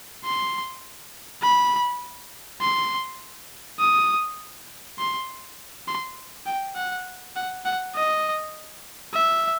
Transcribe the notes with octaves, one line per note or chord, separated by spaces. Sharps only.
C6
B5
C6
D#6
C6
C6
G5
F#5
F#5
F#5
D#5
E5